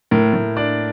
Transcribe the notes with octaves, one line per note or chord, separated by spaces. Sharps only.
A2 A#4
A2
D4 D5